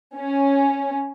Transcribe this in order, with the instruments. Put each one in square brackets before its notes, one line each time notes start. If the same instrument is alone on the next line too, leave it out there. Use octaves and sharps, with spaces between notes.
[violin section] C#4